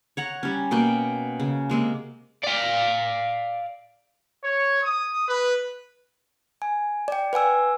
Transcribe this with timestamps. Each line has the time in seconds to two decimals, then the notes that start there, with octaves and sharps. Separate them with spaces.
0.17 C#5 F#5 A#5
0.43 G3 C#4
0.71 B2 A#3 F#4 G5
1.40 C#3
1.70 C3 G#3 A#3
2.44 D5 F5
4.43 C#5
4.82 D#6
5.28 B4
6.62 G#5
7.08 D5 G5
7.33 B4 F#5 G#5 E6